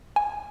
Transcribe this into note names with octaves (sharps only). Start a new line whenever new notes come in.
G#5